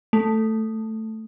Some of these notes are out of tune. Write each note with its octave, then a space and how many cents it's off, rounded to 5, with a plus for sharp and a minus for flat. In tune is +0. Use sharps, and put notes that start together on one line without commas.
A3 +5